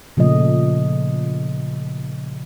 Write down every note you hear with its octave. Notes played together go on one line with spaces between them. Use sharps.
A#2 C#3 F3 A3 D#5